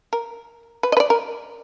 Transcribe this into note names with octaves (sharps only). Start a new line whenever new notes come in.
A#4
B4
D#5
B4
D5
A#4